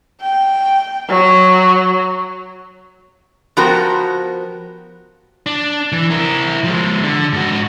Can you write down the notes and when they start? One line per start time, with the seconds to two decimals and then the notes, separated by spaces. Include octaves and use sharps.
0.21 G5
1.08 F#3
3.57 F3 B3 F#4 G4 A#4
5.46 D4
5.92 E3
6.11 E4 A#4
6.64 F3 G#3
7.04 D3
7.33 G#2 F#4